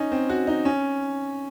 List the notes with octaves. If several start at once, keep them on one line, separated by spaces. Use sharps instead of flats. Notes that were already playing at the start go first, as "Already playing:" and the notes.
Already playing: C#4 D#4
C4
F#4
D#4
C#4